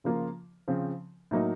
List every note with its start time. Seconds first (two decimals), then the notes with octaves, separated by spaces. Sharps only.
0.04 C#3 F3 A#3 F4
0.68 C#3 F3 C4
1.31 A2 F#3 A#3 D#4